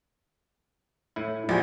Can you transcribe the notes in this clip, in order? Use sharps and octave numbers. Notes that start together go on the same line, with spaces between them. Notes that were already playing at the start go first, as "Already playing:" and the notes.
A2 E4
A#1 F#4 G4 G#5